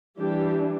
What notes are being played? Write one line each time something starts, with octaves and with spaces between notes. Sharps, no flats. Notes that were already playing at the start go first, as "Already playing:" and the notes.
E3 G3 D4 G4